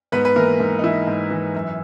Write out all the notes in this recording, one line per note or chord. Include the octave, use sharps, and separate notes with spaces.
G#2 B3 B4
B4
E3 A#3 A#4
G#2
D#4
E3 E4
G#2
E3
F#2